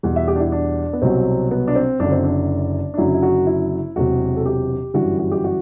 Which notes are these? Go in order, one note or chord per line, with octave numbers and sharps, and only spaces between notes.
E2 B2 G3
E5
G4
D4
E4
D4
B3
C2 B2 F#3 C4
B3
D4
C4
F#1 F#2 D3 D4
C4
D4
D4
F#1 F#2 D3 F#3 E4
E4
F#4
E4
E1 E2 C3 F#3 F#4
A4
G4
G1 F#2 E3 G3 F#4
F#4
G4
F#4